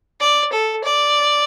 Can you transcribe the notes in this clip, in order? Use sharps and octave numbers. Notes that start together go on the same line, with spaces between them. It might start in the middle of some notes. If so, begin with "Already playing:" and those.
D5
A4
D5